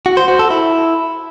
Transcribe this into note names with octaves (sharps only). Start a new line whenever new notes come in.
F#4
C5
F#4
A4
E4